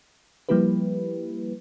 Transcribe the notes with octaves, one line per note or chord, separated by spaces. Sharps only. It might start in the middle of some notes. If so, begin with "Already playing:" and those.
F3 G3 A#3 E4 G4 B4